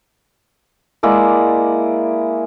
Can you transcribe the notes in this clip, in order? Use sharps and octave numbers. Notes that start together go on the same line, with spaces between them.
G#3 A#3 E4 D5